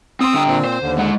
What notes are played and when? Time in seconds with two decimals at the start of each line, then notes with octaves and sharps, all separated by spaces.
0.21 C4 C6 D#6 E6
0.34 D3 G5
0.47 A#2 C4
0.65 C5
0.81 D#2 D3
0.98 G#3 F#5